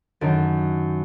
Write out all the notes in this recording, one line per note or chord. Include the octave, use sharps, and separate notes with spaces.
F#2 D#3 A5 G6 D7